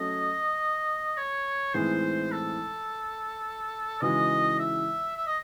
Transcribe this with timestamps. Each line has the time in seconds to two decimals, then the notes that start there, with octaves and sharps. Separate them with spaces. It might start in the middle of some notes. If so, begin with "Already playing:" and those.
Already playing: F#3 A3 C#4 D#5
1.17 C#5
1.74 A2 E3 G#3 C4 D#4 C5
2.31 A4
4.02 C#3 E3 G#3 D#4 F#4 D#5
4.59 E5
5.16 E5
5.27 D#5